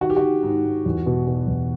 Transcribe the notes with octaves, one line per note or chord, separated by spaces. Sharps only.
D#3 F#4
G4
F#4
D#3
G#2
G#2
E2
B2
B2
E2